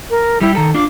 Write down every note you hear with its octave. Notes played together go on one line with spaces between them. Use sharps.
A#4
G3 E4 G4
D#3 A4 A#5
D4 F4 D6